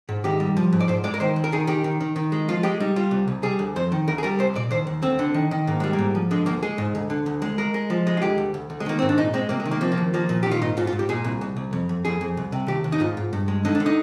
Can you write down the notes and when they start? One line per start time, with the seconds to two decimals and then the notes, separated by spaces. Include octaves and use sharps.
0.09 G#2
0.24 D#3 G4
0.40 G3
0.57 F3
0.72 G#2
0.80 D5
0.88 G#2 C5
1.04 G#3 D5
1.14 A#4
1.20 D#3 C5
1.36 D#2
1.44 A#4
1.52 D#3 G#4
1.67 D#3 G4
1.84 D#3
2.01 D#3
2.16 D#3
2.32 G#3
2.48 F3 F4
2.63 G#3 G4
2.80 G3 D#4
2.96 G3 F4
3.11 C2
3.28 C2
3.43 G3 G#4
3.59 D2
3.76 F2 C5
3.92 D#3
4.08 D2 A#4
4.18 G#4
4.23 G3 A#4
4.39 C2 C5
4.55 A#2 D5
4.71 D#2 C5
4.87 D#2
5.03 D2 C4
5.19 D3
5.34 D#3
5.51 D#3
5.67 G#2 A#3
5.80 G3 G#3
5.93 A#3
5.98 G#2
6.15 F3
6.31 D3 G#3
6.46 D2 A#3
6.62 G#3 G#4
6.78 G#2
6.95 D2
7.10 D3
7.26 D2
7.42 G#3
7.58 G#3 A#4
7.74 G#3
7.90 F3
8.07 G#3
8.17 F4
8.22 D2 G4
8.38 D2
8.54 D2
8.70 D2
8.80 G#3
8.86 D#3 A#3
8.99 G#2 C4
9.09 D4
9.18 A#2 D#4
9.34 G#3 C4
9.49 C3 A#3
9.60 G#3
9.65 D#3
9.71 A#3
9.81 F3 C4
9.92 A#3
9.98 D#2
10.14 F3 A#3
10.29 A#2
10.43 D#3 G4
10.51 F4
10.62 G#2 D#4
10.77 G#2 F4
10.87 F4
10.93 G#2
10.99 G4
11.09 A#2 G#4
11.24 C2
11.41 C2
11.56 C2
11.73 F2
11.89 F2
12.05 F2 G#4
12.21 F2
12.37 C2
12.52 C3
12.68 D#2 G4
12.84 D#2
12.92 D#4
13.00 G#2 F4
13.17 G#2
13.33 G2
13.48 G#3
13.65 D3 D#4
13.75 D4
13.80 D3
13.86 D#4